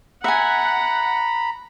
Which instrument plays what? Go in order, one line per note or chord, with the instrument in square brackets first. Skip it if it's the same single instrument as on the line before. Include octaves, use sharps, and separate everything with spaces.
[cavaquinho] E5 G#5 [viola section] F#5 [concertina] A#5 B5